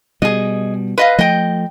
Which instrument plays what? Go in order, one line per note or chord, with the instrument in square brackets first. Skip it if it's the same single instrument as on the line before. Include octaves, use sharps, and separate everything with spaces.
[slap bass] B2 G3 [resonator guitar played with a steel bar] G#4 D#5
[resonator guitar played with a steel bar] B4 D#5 F5
[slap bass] F3 A3 [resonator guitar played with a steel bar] D#5 G5